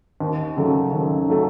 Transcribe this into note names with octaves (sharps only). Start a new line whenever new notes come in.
D#2
C#3 F#3 A3
D#2
C#3 F#3 A3